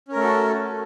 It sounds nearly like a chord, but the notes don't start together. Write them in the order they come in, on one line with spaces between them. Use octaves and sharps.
C#4 A#4 A3 A4 F#4